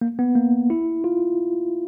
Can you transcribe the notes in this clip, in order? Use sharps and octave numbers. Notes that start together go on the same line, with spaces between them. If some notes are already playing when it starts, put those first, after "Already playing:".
A#3
B3
A#3
E4
F4